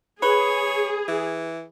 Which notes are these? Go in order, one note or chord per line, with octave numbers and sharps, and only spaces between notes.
G#4 B4 C#5
E3